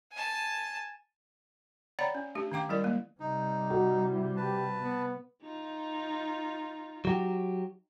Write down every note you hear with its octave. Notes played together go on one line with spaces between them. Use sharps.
G#5 A5
C#5 D5 F#5 G5 A#5 B5
C#4
A3 D4 G4
D#3 C#4 F5 G5 D6
G3 E4 A#4 D5
G#3 A#3
C3 G3 D#4
F#4
E4
G4 B4 A5
B3
D#4 F4
F#3 F#4 G4